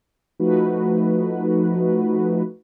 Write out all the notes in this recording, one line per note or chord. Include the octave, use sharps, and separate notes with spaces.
F3 A3 D#4 F#4 B4